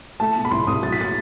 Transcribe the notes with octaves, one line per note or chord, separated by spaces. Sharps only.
A3 A5
B2
B5
C2 C6
C2 D#6
F#3 A6
B6
A6